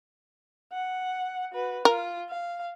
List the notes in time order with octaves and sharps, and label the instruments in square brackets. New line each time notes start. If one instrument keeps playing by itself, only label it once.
[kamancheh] F#5
F#4 B4
[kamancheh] F4 [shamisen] A#4
[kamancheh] F5